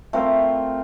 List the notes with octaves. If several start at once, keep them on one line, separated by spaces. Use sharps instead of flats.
A3 C4 F4 A#4